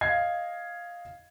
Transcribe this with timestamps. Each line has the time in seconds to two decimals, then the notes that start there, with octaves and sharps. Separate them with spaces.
0.01 D#5 F5 G#6 C7